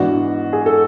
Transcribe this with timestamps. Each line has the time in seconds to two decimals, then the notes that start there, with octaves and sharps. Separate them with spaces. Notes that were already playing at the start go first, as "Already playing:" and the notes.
Already playing: G#2 E3 B3 D4 F#4
0.53 G#4
0.66 A4